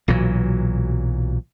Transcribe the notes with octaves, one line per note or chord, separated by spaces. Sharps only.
B1 A#2 E3 F#3